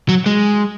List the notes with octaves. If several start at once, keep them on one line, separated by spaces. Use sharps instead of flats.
F#3
G#3